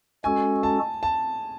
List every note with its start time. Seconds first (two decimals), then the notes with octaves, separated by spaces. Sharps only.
0.24 G#3 C#4 F#4 A4 G#5
0.63 A5
1.03 A5